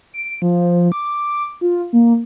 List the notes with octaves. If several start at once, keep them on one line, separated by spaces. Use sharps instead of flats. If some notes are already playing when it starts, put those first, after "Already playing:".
D7
F3
D6
F4
A#3